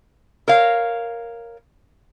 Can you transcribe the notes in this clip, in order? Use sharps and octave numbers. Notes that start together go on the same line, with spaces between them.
A#4 C#5 F5